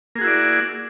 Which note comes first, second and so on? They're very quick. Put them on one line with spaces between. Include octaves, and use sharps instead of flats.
A#3 G#4 F#4 E4 D5